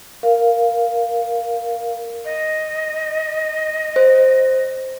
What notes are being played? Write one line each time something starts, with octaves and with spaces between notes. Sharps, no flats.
A#4 F5
D#5
C5